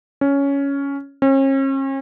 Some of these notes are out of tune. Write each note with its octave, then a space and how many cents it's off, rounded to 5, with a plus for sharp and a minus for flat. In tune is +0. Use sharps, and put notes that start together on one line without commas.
C#4 +10
C#4 -40